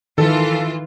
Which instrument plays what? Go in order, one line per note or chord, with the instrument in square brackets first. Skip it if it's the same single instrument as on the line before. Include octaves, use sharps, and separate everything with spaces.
[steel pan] D#3 [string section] E3 F4 [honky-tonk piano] A4